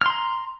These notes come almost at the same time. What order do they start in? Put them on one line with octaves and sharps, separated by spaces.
F6 C6 A#5